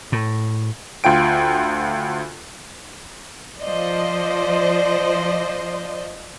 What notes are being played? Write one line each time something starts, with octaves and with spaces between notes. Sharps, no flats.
A2
D2 F4 G5 D7
F3 C5 D5 D#5